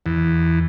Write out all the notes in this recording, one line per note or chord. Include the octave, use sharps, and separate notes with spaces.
E2